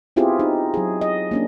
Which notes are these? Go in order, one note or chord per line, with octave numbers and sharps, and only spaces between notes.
B3 C4 E4 F4 G4 G#4
D#4
F#3 G#4
D#5
A#3 C#4 D4